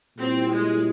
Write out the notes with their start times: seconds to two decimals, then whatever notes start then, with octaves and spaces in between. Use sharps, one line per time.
0.17 A#2 G3 C4 C#4 E4
0.50 G#3